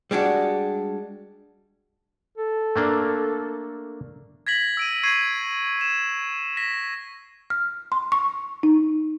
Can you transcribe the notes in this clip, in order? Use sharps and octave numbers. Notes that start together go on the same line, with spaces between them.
G3 G#3 D4 F#4
A4
A3 A#3 D4
G#6 A#6 B6 F#7
E6 D7 D#7
C#6 G#6 C7 D#7
E7
A#6 B6
F6
C6
C#6
D#4